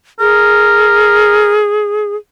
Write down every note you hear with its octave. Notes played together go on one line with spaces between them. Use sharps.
G#4 A#4